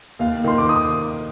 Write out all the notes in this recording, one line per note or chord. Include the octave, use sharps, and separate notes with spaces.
D#2 F5
D#3 C6
D6
D#6